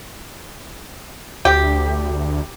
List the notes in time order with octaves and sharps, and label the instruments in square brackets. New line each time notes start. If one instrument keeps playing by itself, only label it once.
[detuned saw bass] D2 [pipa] G4